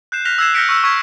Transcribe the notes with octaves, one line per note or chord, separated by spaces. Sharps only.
F#6 G6 C7 E7
F6 F#6 A#6 B6 F7
E6 F#6 G#6 C7 E7
F6 G6 A#6 B6 C#7 D7
C#6 E6
C#6 F6 G#6 B6